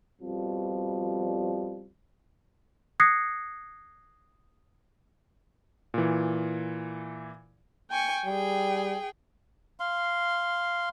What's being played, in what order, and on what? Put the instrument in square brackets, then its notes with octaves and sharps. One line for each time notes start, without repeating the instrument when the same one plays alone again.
[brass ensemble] F2 B2 F3 G3
[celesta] D#6 F#6 G#6 A#6 C7 C#7
[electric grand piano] A#2 E3
[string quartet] G5 G#5 C#6
[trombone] G3 [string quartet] G#4 G5
[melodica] F5 C6